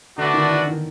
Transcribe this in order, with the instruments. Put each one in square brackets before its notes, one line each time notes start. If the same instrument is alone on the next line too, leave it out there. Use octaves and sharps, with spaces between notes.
[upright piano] D3 [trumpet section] A3 D4 F#4 B4 D5
[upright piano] D#3
E3
D#3